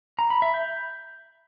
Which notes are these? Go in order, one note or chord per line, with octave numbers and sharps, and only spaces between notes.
A#5
B5
E5
G6